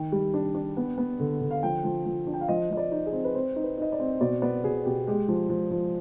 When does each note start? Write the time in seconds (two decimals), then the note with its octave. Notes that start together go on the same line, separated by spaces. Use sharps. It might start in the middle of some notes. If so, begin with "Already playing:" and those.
Already playing: D#3 G5
0.12 G3
0.34 D4
0.54 D4
0.77 B3
0.98 B3
1.20 D3
1.41 D3
1.51 F5
1.63 F3 G5
1.84 F3
2.05 F3
2.27 D4
2.34 G5
2.41 F5
2.48 F3 D#5
2.70 F3 D#5
2.77 D5
2.92 D#4
3.06 G#4
3.13 C4
3.24 B4
3.35 C4 C5
3.56 D#4
3.64 B4
3.78 D#4 D#5
3.92 D5
4.00 C4
4.12 C5
4.21 B2 D5
4.42 B3 D5
4.64 B2 G#4
4.85 B2 G4
5.07 G#3 G4
5.28 F3
5.49 F3
5.71 F3